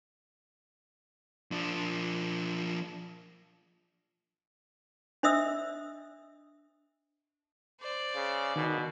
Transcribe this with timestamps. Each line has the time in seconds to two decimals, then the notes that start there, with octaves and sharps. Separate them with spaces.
1.51 F3 D4
5.23 D4 C5 D#5 E5 D#6 E6
7.81 C5 D5
8.15 C#3
8.56 B2 D#3